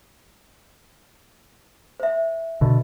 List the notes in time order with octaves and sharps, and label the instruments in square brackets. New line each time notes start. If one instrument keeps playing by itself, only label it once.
[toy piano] C5 E5
[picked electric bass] B2 D3